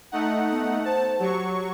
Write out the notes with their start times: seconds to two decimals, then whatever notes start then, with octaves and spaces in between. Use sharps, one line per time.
0.12 A3 D#4 F#5
0.51 B3
0.85 C5 A5
1.20 F#3 G4 C#6